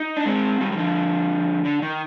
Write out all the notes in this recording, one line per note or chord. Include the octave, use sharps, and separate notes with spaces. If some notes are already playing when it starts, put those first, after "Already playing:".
Already playing: D#4
D4
G#3 C4
D#3 G3
G3
D3 F3
D3
D#3